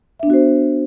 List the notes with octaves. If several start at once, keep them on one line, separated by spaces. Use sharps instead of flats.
B3 D4 F#4 C5 E5